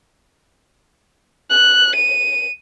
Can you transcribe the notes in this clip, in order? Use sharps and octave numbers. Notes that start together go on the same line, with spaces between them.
F#6
D#7